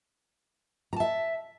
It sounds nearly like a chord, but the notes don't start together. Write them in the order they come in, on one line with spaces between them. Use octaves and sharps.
A#5 A5 E5